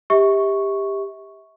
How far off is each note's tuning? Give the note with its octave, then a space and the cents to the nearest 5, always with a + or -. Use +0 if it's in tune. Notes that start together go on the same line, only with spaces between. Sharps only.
G4 +15 E5 -35 C#6 +0